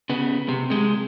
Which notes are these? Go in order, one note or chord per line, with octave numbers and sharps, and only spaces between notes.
C#3 B3
C3
C3 G#3